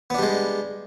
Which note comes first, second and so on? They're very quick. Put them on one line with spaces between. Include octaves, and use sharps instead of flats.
B3 D4 G3 G#3